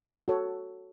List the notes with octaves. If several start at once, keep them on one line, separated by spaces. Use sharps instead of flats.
F#4 A4 C#5